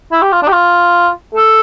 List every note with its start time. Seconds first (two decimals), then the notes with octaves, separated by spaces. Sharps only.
0.12 E4
0.22 G4
0.32 F4
0.43 D4
0.48 G4
0.52 F4
1.35 A4